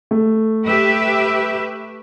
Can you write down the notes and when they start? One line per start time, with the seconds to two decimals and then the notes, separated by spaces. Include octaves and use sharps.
0.11 A3
0.66 G4 B4 E5